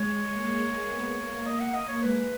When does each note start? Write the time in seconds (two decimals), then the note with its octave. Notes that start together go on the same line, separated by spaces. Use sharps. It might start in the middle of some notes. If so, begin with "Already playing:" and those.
Already playing: G#3 C#5
0.32 A#3
0.89 B3
1.18 A#3
1.45 A#3 D#5
1.60 F#5
1.74 A#3 D#5
1.88 C#5
2.02 G#3 B4